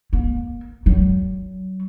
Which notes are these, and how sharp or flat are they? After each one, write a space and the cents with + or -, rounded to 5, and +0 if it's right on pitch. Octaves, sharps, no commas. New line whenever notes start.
A#3 +40
F#3 +30